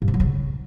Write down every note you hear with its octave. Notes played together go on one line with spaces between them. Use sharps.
G2
C3
F#3
C#3